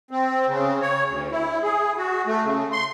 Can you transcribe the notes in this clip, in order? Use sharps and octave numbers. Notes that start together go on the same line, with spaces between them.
C4
C#3
C#5
D2
E4
G#4
F#4
A3
C#3
C6